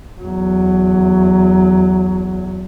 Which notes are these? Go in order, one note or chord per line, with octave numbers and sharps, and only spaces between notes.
E2 F#3